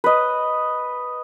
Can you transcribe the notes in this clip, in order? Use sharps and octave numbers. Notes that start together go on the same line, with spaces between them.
B4 D#5